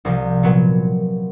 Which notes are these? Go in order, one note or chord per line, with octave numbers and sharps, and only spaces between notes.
C2 C3 F3
A#2 F#3 B3